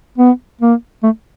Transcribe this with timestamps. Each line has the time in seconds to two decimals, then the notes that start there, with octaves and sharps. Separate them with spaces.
0.18 B3
0.61 A#3
1.03 A3